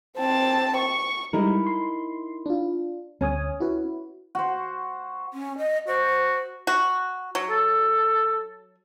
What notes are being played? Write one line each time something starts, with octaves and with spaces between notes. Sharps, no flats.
C4 A5
C#6
G3 G#3 D#4 E4 A#4
C6
D4 F4
D2 C#4 G#5 D#6
E4 F#4 B4
F#4 C5
C#4
D#5
F#4 C5
F#4
F#3
A4